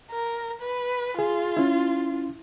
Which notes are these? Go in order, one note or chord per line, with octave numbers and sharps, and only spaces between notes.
A#4
B4
F4 G#4
C#4 E4